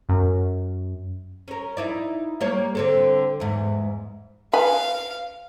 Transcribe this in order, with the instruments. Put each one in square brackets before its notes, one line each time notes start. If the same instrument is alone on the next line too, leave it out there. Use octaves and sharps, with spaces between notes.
[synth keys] F#2
[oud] C#4 A#4
D#4 E4 D5
G3 A#3 C#5
D3 C4 A4
E2 G#2
[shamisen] B4 G#5 [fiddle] F5